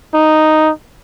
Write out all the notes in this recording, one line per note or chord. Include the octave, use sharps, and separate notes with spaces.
D#4